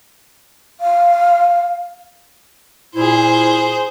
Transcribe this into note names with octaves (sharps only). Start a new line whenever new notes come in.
F5
A#2 E4 G#4 C5